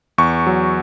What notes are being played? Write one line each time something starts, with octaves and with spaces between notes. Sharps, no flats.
E2 C#6
F#3